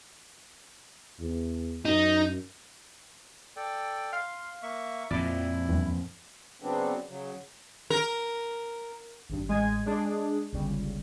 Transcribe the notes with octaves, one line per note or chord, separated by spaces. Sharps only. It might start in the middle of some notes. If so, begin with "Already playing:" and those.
E2
F#2 D#4
A4 D5 G5
F5 C6
A#3 E5 C#6
F2 A#2 F3 E4 D5
E2 G2
C#3 F#3 B3 C4 D4
C#3 F#3
A#4
G#1 G2
A1 G#3 G#5 G#6
G#3 D4 G#4
G1 C#2 C#3 G3